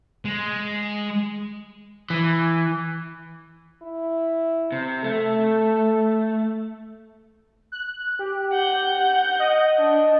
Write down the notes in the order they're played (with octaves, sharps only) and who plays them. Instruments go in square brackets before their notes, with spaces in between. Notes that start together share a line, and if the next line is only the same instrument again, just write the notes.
[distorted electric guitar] G#3
[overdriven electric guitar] E3
[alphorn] E4
[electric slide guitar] C3
[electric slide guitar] A3 [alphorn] A4
[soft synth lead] F#6
G4
[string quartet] F#5 G6
[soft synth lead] D#5
[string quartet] D4